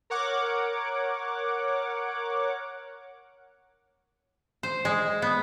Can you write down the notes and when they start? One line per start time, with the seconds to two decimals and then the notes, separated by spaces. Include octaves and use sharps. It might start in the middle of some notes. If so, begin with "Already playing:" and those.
0.10 A#4 C#5 F#5 D6
4.63 C5
4.85 G#3
5.22 B3